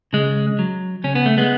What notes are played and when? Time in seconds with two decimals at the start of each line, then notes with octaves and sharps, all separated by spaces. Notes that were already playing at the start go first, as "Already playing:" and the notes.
0.13 C#3 G#3
0.59 F#3
1.04 C#3 C#4
1.15 B3
1.26 A3
1.38 G#3 B3